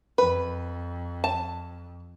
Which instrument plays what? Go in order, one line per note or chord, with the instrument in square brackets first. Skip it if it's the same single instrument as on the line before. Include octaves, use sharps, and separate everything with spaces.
[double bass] F2 [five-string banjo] B4
[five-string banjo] A5